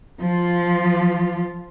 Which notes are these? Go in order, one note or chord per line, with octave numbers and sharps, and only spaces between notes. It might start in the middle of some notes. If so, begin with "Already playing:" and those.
F3 F4